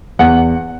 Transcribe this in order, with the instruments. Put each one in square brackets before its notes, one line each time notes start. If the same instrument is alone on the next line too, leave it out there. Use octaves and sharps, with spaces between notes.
[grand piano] E2 F#5